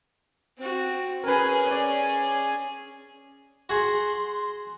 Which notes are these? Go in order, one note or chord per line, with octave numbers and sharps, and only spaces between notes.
C4 F#4
C#4 G#4 A#4 B4
C#5 D5
F#4 G#4 C6